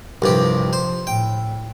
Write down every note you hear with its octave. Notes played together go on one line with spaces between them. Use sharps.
C2 G2 C3 F3 G4
C5
A2 G5